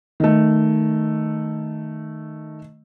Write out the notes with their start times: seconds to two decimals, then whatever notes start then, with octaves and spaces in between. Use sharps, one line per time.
0.20 D#3 A3